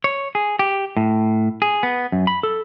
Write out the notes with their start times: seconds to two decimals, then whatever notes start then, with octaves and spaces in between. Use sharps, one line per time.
0.04 C#5
0.35 G#4
0.59 G4
0.97 A2
1.62 G#4
1.83 B3
2.12 F#2
2.27 B5
2.43 A4